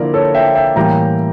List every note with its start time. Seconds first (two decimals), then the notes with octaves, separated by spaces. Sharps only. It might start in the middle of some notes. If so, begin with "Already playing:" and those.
Already playing: D3 F3 A#3 E4 A#4 D5
0.14 A4 C#5
0.34 E5 G5
0.55 E5 G5
0.76 A2 E3 G3 A#3 G5 A#5